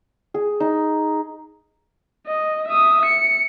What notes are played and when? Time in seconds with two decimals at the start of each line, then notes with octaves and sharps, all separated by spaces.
0.34 G#4
0.60 D#4
2.27 D#5
2.68 E5 D#6
3.06 C#7